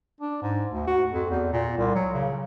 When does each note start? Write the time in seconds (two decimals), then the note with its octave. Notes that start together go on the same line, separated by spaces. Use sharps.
0.20 D4
0.42 G#2
0.71 D2
0.87 F#4
1.12 F2
1.31 E2
1.53 A#2
1.77 C2
1.95 F#3
2.14 C#3